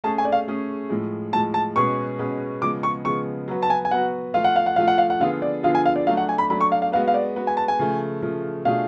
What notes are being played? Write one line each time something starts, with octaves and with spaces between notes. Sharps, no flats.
A3 C#4 G#4 A5
G#5
D5
F5
A3 C#4 G#4
A2 F3 G#3
A2 F3 G#3 A5
A5
B2 G#3 C#4 G#4 B4 C#6
B2 G#3 C#4 G#4 B4
C#3 F3 G#3 B3 D6
C#6
C#3 F3 G#3 B3 C#6
F#3 B3 F#4 B4
A5
G#5
G#5
F#3 B3 F#4 B4 F#5
F3 A3 F4 F5
F#5
F5
F#5
F3 A3 F4 F5
F#5
F5
F#5
D3 F3 B3 F4 G#4 F5
D5
D3 F3 B3 F4 G#4 F5
G#5
F5
D5
F#3 A3 D4 F5
F#5
G#5
B5
F#3 A3 D4 B5
C#6
F5
F5
G#3 B3 F#4 B4 F5
F5
D5
G#3 B3 F#4 B4
G#5
A5
G#5
C#3 F3 A3
C#3 F3 A3
B2 A3 D4 F4 G#4 F5